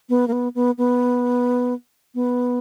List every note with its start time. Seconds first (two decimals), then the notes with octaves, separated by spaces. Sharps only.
0.09 B3
0.28 A#3
0.32 B3
0.55 B3
0.78 B3
2.15 B3